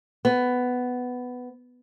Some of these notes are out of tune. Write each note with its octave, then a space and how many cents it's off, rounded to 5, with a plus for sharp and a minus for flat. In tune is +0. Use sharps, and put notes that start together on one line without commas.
B3 +10